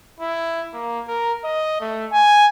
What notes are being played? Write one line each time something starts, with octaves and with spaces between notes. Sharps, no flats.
E4
A#3
A#4
D#5
A3
G#5